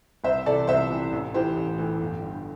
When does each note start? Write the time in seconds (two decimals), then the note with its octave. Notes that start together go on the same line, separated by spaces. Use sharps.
0.24 C2 C5 E5
0.46 C3 E3 A4 D5
0.67 C2 C5 E5
0.90 C3 E3
1.12 A1
1.34 A2 E3 G4 C5
1.57 A1
1.78 A2 E3
2.01 G1
2.22 G2 D3